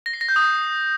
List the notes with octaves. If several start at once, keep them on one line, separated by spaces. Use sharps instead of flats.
A#6
C7
A#6
G6
D#6